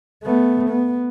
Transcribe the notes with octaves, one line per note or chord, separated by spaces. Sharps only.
A3 B3
B3